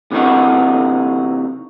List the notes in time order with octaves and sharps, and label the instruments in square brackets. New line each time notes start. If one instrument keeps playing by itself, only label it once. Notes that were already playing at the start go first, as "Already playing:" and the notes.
[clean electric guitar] C3 E3 C4 D#4 F#4